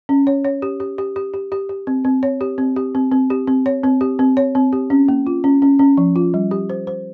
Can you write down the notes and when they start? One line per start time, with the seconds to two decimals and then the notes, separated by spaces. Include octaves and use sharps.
0.09 C#4
0.27 C#5
0.45 C#5
0.62 G4
0.80 G4
0.98 G4
1.16 G4
1.34 G4
1.52 G4
1.69 G4
1.87 C4
2.05 C4
2.23 C#5
2.41 G4
2.58 C4
2.76 G4
2.95 C4
3.12 C4
3.30 G4
3.47 C4
3.66 C#5
3.84 C4
4.01 G4
4.19 C4
4.37 C#5
4.55 C4
4.73 G4
4.90 C#4
5.08 A#3
5.27 F4
5.44 C#4
5.62 C#4
5.79 C#4
5.97 F3
6.16 F4
6.34 G3
6.51 G4
6.70 C5
6.87 C5